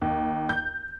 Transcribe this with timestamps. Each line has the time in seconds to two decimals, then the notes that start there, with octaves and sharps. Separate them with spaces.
0.02 D#2
0.49 G6